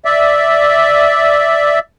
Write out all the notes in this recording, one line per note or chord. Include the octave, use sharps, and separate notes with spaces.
D5 E5